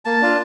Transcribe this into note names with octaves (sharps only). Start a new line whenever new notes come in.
A#3 A5
D4 F4